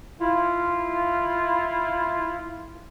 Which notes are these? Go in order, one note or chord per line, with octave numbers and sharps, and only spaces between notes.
E4 F4